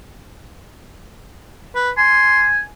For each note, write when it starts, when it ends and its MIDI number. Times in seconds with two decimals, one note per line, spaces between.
1.76 1.90 71
1.98 2.61 80
1.98 2.46 84